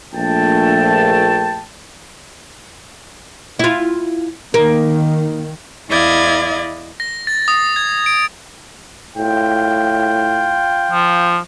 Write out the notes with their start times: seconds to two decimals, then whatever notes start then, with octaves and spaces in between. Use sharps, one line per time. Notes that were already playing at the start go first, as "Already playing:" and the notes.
0.14 A#1 A3 G5 A5
3.59 E4 F4
4.54 D#3 A#3
5.89 E2 E4 D5 D#5 F5 G#6
7.00 A#6
7.27 A6
7.48 D#6
7.76 G#6
8.06 D7
9.17 A2 F4 G5
10.91 F3